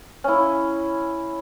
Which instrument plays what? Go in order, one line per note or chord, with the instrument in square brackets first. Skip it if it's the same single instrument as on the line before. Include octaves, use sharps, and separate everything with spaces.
[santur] C#4 E4